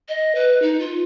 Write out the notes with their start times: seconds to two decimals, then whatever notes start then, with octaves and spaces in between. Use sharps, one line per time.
0.09 D#5
0.35 B4
0.62 D#4
0.80 F4